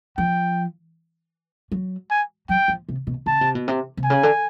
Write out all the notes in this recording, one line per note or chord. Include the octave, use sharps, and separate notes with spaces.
F3 G5
F#3
G#5
F#3 G5
F3
C3
B2
C#3 A5
C3
B2
C3
C3
G#5
C#3
D3